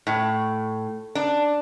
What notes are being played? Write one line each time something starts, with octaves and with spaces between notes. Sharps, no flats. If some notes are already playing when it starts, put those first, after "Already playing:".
A2
D4